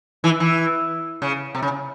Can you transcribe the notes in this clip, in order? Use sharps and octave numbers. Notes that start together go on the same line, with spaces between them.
E3
E3
C#3
C3
C#3